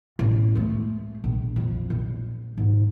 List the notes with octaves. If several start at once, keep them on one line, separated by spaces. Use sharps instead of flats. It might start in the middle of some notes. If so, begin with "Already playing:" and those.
A1
G#3 A3
A#1
F2
A#1
G#2 D#4